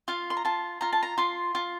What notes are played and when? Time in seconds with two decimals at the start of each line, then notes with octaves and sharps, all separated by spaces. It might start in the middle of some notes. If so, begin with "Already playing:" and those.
0.08 F4 F5
0.30 C6
0.37 A#5
0.45 F4 A5
0.81 F4 A#5
0.93 A5
1.03 A#5
1.18 F4 C6
1.55 F4